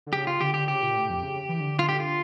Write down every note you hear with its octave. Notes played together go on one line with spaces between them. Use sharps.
D3
C#3 G4
F4
D3 G4
G4
C#3 G4
A#2
A2
F2
C#3
E3
D3
F4
G4
F4